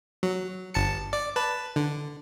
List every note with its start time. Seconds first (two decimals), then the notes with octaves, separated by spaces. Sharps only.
0.23 F#3
0.74 G1 A5 C#7
1.13 D5
1.36 B4 A5
1.76 D3